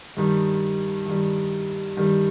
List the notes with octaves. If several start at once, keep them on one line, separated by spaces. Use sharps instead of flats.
G2 D#3 G3
G2 D#3 G3
G2 D#3 G3